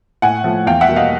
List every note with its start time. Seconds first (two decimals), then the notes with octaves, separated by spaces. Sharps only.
0.22 A2 F#5 G#5
0.44 F3 A3
0.66 E2 F5 G5
0.81 E5 F#5
0.88 B2 G3 A#3
0.96 D#5 F5